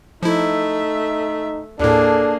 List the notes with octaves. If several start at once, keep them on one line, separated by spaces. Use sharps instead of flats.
F3 A3 D#4 E4 E5
D#2 A2 A#3 D4 G#4 A4